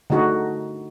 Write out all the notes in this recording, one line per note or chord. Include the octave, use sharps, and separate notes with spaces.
D3 A3 D#4 F#4 G#4